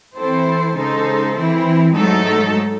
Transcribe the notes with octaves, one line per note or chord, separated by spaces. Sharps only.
E3 C4 E4 A4 C5
C#3 G#3 D#4 A4 C5
E3 C4 E4
G#2 F#3 A3 D#4 A4